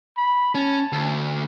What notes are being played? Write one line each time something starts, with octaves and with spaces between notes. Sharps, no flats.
B5
C#4 A5
D2